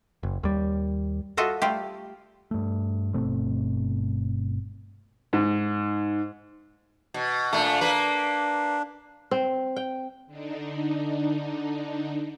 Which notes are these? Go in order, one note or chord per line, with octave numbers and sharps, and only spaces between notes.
F#1
D#2 G3
F4 F#4 A4 D#5 E5
G3 A3 F4 G4
G2 A3
G1 B2 A3 C4
G#2
B2
A#2 A3 D4
A#3 B4
C4
G5
D3 D4 D#4